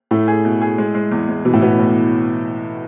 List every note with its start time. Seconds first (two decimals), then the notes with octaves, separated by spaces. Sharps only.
0.11 A2 A3
0.28 G#4
0.45 B2
0.61 G#4
0.78 G#3
0.94 G#3
1.12 E2
1.28 G#3
1.45 B2 E3
1.53 A2
1.62 B2 B3
1.78 A2